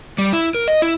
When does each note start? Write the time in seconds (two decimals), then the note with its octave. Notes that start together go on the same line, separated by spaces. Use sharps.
0.18 G3
0.33 E4
0.55 A#4
0.68 D#5
0.82 E4